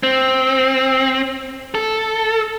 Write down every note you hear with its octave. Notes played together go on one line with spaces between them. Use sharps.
C4
A4